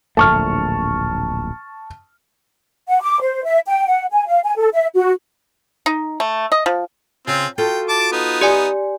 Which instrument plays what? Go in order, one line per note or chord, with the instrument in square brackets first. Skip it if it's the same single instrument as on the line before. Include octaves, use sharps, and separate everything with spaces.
[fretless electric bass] D1 A#1 A3 [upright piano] A5 C#6 F6
[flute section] F#5
D6
C5
E5
G5
F#5
G#5
F5
G#5
A4
E5
F#4
[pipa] D#4
A3
D#5
F3
[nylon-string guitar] C#3 [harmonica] C4 F4
[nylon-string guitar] F4 F#4 A4 [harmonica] G5
[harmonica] A5 D6
B3 D#4
[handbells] G4 D5 G#5